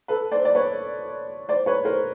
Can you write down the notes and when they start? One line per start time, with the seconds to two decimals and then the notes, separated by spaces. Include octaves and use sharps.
0.08 A4 B4
0.32 C5 D5
0.45 D5
0.55 B4 C#5
1.49 C5 D5
1.66 B4 C#5
1.85 A#4 C5